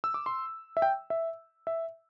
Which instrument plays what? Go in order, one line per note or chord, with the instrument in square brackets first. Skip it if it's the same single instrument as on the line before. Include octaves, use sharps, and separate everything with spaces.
[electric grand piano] E6
D6
C6
E5
G5
E5
E5